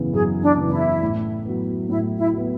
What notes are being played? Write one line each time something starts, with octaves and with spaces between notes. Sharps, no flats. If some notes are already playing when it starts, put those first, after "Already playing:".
Already playing: F#2 C#3 E3 B3
F#2 G#4
D4
C#3 E3 B3
D4
E4
A2
F#3 B3
A2 E4
E4
F#3 B3